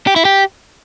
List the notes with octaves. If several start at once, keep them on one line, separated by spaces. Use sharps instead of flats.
G4
E4
G4